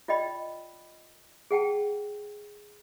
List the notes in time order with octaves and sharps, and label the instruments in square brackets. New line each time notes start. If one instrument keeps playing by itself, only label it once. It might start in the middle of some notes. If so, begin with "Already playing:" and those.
[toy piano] F4 D5 D#5 G5 B5
G#4 F#5 G5 A5